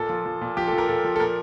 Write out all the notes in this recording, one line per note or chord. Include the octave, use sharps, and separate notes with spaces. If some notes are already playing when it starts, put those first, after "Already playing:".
Already playing: A#2 A4
F3
F3
A#2
F3 G4
A4
F3
A#4
A#2 A4
F3
A4
A#2 A#4